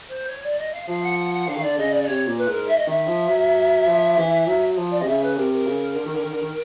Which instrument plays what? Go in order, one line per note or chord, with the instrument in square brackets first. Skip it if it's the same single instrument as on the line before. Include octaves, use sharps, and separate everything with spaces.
[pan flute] C5
C#5
D5
D#5
F5
[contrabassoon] F3 [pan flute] F5
[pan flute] F#5
F#5
F#5
[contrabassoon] D3 [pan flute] F5
[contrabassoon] D#3
[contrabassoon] D3 [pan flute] D5
[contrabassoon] C#3 [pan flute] D#5
[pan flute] D5
D5
[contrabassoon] C3 [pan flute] C#5
[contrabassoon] A#2
[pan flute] B4
[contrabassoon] G#2 [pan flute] A#4
[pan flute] E5
D#5
[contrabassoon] D#3 [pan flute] E5
[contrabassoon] F3
F#3
F3
E3
F#3
F3
[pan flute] D5
[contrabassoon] C3 [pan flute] D#5
[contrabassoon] C#3 [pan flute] E5
[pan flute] B4
[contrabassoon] C3 [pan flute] A#4
[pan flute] A#4
[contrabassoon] C#3
D3
D#3
D3
D#3
D3
D#3